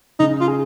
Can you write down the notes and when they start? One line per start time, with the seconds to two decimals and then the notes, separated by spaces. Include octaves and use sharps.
0.19 C#3 D#4
0.40 F4
0.48 G#4